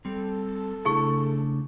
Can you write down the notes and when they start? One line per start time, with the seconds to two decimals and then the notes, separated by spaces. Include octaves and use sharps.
0.05 G3 C4 A4
0.85 C#3 A3 D4 E4 G#4 C#6